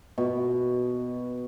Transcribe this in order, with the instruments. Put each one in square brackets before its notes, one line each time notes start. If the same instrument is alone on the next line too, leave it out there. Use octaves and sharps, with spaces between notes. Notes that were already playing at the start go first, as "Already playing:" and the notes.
[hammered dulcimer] B2